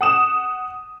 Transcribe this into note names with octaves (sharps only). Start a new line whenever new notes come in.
F#5 D#6 E7